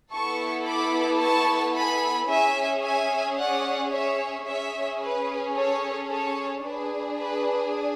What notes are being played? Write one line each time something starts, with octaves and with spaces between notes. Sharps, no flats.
B3 E4 A4 A5 C#6
B5 D6
A5 C#6
G#5 B5
C#4 G#4 E5 G#5
E5 G#5
D5 F#5
C#5 E5
C#4 G#4 C#5 E5
B4
A4 C#5
A4 C#5
D4 G#4 B4
B4